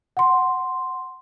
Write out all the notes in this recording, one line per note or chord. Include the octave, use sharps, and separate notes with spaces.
F#5 C6